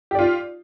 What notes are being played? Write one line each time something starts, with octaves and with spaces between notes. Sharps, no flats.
F4 G4 D5